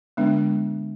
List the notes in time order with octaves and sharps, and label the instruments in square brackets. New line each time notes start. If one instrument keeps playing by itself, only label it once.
[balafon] D3 G#3 B3 D4